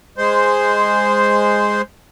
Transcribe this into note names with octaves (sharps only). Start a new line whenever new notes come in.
G#3 C5